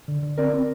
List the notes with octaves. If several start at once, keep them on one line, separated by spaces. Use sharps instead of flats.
D3
D3
C4 A#4 D5
C4